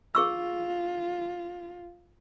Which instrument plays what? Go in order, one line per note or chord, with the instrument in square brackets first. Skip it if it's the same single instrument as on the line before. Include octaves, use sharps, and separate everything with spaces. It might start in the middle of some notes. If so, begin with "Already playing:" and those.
[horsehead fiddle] F4 [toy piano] G#4 C#6 E6